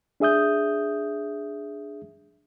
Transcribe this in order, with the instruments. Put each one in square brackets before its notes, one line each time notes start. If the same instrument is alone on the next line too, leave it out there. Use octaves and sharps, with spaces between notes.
[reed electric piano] D4 G#4 E5 D#6 G6